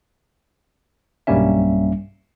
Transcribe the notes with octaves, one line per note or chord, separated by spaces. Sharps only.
B1 G2 G3 A#3 C#4 E5